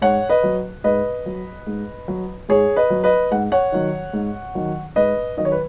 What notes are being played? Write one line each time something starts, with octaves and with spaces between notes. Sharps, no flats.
G#2 C#5 F#5
B4 D#5
F#3
G#2 B4 D#5
F#3
G#2
F#3
G#2 G#4 C#5
B4 D#5
F#3
B4 D#5
G#2 F#5
C#5 F#5
D#3 F#3
G#2
D#3 F#3
G#2 B4 D#5
D#3 F#3 D#5
C#5
B4